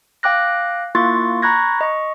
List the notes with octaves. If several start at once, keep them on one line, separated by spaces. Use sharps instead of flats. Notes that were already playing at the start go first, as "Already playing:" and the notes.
F5 G5 D6 F#6 A#6
A#3 E4 F4 C6 C#6 A6
A#5 B5 C#6 F#6 G#6 A#6
D#5 C#6